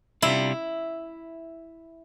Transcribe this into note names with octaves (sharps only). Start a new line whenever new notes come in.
C3 G3 D4 E4 F4